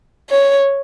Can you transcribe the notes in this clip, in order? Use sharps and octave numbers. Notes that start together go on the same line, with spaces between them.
C#5